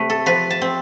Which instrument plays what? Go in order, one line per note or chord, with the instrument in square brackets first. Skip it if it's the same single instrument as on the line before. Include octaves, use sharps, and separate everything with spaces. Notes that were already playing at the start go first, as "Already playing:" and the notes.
Already playing: [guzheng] C3 A3 B4
A4
F3 B4
A5
C4